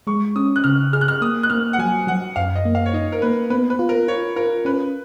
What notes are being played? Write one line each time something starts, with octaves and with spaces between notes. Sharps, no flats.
G#3 C#6
C#4 D#6
F#6
C#3 F6
G#4 F6
F#6
F6
A#3 D#6
F#6
A#3 F6
F#5
F#3 G#5
F#3 F#5
F#2 F5
D#5
A#3
F5
C#5
D#4 D#5
A#4
A#3 B4
B3 B4
B4
F4
A#4
F4 C#5
F4 A#4
C#4 B4